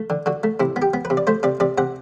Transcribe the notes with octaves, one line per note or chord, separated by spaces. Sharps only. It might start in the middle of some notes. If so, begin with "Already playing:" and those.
Already playing: A3
D3
D3 F#4
A3
C3 E4
B3
G4
B3
B4
C3
D5
A3 C5
C3 D5
C3 D5
C3 F#5